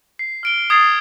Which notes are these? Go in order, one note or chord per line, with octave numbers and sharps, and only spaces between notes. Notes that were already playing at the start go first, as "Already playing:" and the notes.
C7
F6 D7 G7
D#6 G#6 A6 C7 F7